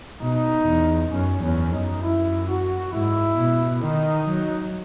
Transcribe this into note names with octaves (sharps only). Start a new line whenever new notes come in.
B2 D#4
E2
F#2 C#4
E2 C#4
F#2 D#4
E4
F#4
G#2 E4
B2
D#3 D#4
F#3